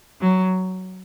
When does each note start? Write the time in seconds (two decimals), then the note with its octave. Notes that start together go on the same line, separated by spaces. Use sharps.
0.21 F#3